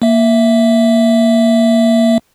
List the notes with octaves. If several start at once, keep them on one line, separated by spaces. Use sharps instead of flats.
A#3 E5